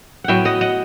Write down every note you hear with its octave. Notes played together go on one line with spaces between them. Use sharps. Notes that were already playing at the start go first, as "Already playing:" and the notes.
A2 F#3 B3 E5 F#5 G5
D#5 F#5
D#5 F#5